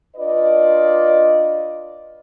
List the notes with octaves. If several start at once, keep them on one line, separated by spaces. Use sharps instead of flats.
D4 F4 B4 D5 D#5